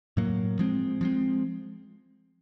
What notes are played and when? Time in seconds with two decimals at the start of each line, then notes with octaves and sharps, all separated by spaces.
0.17 A2 F#3 A#3
0.59 F3 G#3 C4
1.01 F3 G#3 C4